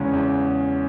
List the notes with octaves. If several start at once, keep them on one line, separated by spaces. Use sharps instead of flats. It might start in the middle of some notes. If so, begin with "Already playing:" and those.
Already playing: E2 C#3 G#3 C#4
E2